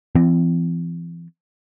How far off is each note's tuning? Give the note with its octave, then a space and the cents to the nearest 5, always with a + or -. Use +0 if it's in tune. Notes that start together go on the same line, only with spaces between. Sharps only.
E3 +40 C4 -35